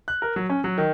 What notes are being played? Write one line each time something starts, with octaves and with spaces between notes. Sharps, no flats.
F#6
A#4
F#3
C#4
F#3
D#3